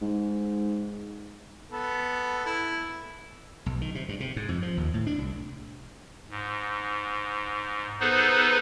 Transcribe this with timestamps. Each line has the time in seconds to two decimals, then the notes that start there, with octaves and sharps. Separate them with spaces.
0.02 G#2
1.71 B3 A4
2.46 E4
3.66 B1
3.81 D#3
3.95 C3
4.09 G2
4.20 C3
4.36 G#2
4.49 F2
4.62 F3
4.77 D#2
4.94 A2
5.07 D4
5.19 C2
6.30 G#2
8.00 B3 D#4 G#4 A4 B4 C5